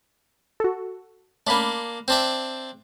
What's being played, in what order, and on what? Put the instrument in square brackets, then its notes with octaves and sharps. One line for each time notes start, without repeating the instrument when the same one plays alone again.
[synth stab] F#4 A4
[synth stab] A3 C#4 B5 [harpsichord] A#3 D4
[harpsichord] C4 D4 E5